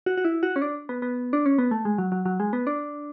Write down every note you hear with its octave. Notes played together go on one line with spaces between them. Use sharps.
F#4
F#4
E4
F#4
C#4
D4
B3
B3
D4
C#4
B3
A3
G#3
F#3
F#3
F#3
G#3
B3
D4